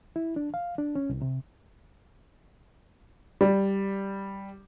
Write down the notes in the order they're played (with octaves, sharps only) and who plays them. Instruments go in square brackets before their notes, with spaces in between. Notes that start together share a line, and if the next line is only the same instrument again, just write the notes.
[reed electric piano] E4
D4
F5
D4
C#4
C2
C3
[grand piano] G3